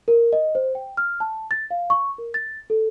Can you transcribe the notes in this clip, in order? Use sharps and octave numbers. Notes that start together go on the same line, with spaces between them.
A#4
D#5
C5
G5
F6
A5
A6
F5
C#6
A#4
A6
A4